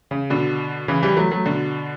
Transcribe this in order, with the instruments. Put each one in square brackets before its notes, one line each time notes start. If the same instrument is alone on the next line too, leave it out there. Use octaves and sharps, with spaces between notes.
[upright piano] C#3
B2 D3
C#3 E3
E3 G3
F#3 A3
F#3 A3
B2 D3